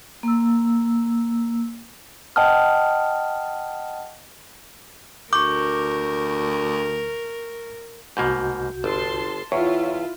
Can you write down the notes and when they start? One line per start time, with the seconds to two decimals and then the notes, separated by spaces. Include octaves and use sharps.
0.23 A#3 E6
2.36 D#5 F#5 G5 A5 D#6 F6
5.33 D2 A#4 C#6 D6 G6
8.17 C2 G#2 B2 A#3 F#4 G6
8.84 G1 A5 C6
9.52 E2 E4 F4 C#5